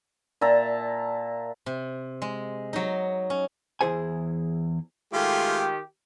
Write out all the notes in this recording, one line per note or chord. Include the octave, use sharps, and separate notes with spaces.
A#2 E5 A5 A#5
C3
G#3
F#3 D#4
C#4
E2 E4 G#4 C5 G#5
D#3 G#3 A3 F4 G4